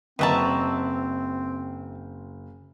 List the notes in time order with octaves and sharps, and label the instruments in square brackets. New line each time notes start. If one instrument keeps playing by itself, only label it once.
[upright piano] F#1 [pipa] B2 F#4 A5 [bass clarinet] C4 [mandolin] B4 E5 A#5